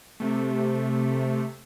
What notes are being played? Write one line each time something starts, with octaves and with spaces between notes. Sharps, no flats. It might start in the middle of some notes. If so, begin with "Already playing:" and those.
C3 A3